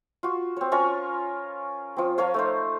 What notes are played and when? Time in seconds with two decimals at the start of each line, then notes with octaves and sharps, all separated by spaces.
0.23 F4 F#4
0.57 C4 C#5
0.72 C#4 F4 A#4 C#6
1.97 F3 C4
2.18 F3 A#4 C#5 F5
2.34 A3 D#4 C5